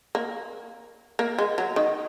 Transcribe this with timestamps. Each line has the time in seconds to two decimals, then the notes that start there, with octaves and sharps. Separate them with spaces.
0.15 A#3
1.19 A#3
1.38 G#3
1.58 F#3
1.76 D#3